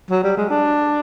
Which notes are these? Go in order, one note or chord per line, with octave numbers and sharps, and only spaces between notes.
F#3
G3
G#3
D4